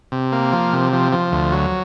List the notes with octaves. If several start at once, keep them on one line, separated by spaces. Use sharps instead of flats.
C3
A#3
F3
C3
F3
F3
D2
F#3